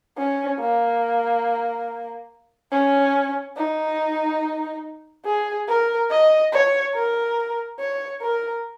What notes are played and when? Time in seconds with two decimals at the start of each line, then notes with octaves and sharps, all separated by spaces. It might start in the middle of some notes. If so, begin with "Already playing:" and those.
0.18 C#4
0.60 A#3
2.72 C#4
3.56 D#4
5.25 G#4
5.68 A#4
6.10 D#5
6.52 C#5
6.95 A#4
7.79 C#5
8.22 A#4